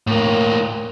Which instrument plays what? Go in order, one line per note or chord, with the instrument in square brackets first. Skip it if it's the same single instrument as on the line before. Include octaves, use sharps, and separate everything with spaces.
[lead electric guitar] A2 A#3